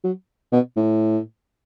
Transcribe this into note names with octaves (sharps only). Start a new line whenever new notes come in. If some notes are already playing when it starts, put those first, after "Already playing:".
F#3
B2
A2